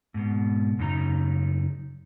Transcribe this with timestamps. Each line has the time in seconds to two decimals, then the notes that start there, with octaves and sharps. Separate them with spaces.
0.14 G#2 B2
0.79 F#2 C#3 D#4 A#5